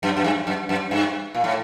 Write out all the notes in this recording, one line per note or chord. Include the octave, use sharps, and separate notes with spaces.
F#2
F#2
G2
F#2
F#2
G2
A#2
A2